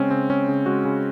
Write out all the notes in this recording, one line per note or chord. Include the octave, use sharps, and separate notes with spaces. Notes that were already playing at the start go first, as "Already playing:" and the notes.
Already playing: C#3 G#3 C4 C#4
C#3 C4
G#3 C#4
C#3
G#3 F#4
C#3